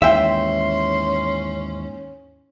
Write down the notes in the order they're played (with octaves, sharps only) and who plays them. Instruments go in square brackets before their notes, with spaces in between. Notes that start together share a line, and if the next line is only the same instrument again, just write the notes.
[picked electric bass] D#2 G#2 E3 [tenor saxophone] C#4 [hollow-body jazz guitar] E5 G5 [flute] C6